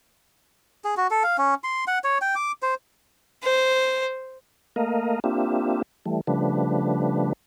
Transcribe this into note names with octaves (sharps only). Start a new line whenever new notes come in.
G#4
F#4
A4
F5
C#4
C6
F#5
C#5
G5
D6
C5
C5
A3 A#3 A#4 D#5 F5
A#3 C4 D4 F4 G4 E5
E3 G3 A3
C#3 F3 G3 A3 D4 B4